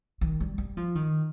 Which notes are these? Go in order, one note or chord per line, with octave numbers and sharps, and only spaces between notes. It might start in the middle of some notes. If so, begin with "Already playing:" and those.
D#3
G3
G3
F3
D#3